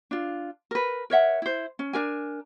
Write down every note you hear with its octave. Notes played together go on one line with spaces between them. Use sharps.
D4 F4
A#4 B4
A#4 C#5 E5 F#5
E4 C5
C#4
D4 A#4 G#5